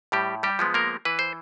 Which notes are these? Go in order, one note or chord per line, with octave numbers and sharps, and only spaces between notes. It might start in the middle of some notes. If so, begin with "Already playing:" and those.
A2 G3 G4
G3 G4
F3 G#3 B3
A#3 A#4
E3 B4
C5